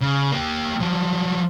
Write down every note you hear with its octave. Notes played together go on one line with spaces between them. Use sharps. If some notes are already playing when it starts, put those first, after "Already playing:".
C#3
A#3 G4
F3 F#3